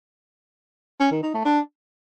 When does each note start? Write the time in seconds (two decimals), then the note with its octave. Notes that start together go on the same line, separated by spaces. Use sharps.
1.00 C#4
1.11 D#3
1.23 D#4
1.34 A3
1.45 D4